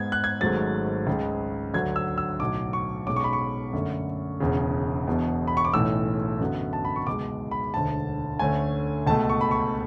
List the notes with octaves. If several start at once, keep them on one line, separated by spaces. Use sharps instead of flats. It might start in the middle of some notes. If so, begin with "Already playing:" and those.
Already playing: G#2 G#3 B3 G#6
F#6
G#6
G#1 G#2 F#3 A3 C#4 A6
C#2 C#3 G#3
D2 D3 F#3 G#6
E6
E6
B1 A2 F#3 D6
C#6
B1 B2 G#3 C#4 D6
C#6
B5
C#6
F#2 D3 A3 C#4
E1 E2 C#3
E1 E2 B2
B5
C#6
D6
B1 A2 E3 A3 C#4 E6
F#2 D3 F#3 B3
A5
B5
C#6
C#2 B2 G#3 D6
B5
E1 D2 D3 A5
D2 D3 A3 C#4 G#5
C#2 B2 A3 A5
C#6
B5
C#6